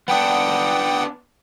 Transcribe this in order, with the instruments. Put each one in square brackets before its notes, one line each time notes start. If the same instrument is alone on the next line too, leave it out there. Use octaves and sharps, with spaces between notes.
[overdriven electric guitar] B3 D4 [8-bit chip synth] F#5 G5 D#6